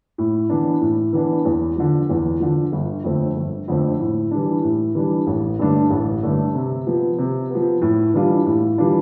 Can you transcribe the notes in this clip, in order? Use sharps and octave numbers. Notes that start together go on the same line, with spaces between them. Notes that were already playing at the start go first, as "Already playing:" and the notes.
A2
E3 B3 D4
A2
E3 B3 D4
E2
D3 F3
E2
D3 F3
G1
F2 D3 A3 C4
G1
F2 D3 A3 C4
A2
E3 G3 D4
A2
E3 G3 D4
A1
G2 D3 A3 D4
A1
G2 D3 A3 D4
C3
F3 B3
C3
F3 B3
A2
E3 G3 D4 F4
A2
E3 G3 D4 F4